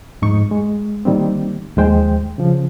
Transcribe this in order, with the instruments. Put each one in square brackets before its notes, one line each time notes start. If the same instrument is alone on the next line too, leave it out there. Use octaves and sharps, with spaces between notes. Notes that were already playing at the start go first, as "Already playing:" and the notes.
[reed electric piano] F2 G#2 D#4 C#6
G#3
D#3 G3 A#3 C4
D#2 F3 G#3 C5 G5
C#3 F3